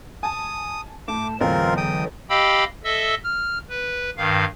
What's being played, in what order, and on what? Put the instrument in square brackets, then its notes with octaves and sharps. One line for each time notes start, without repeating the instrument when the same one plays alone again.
[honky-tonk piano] G#5 A5 [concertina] D#6
[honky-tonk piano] A2 [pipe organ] A5 [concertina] D6
[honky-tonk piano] A1 E2 [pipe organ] D3 E3 F#3 [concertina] C4 F4 A#4
[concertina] G5 D#6
[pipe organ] G4 D#5 F5 G5 B5 E6
A4 D#5 E5 E6
F6
B4
G2 D#3 F5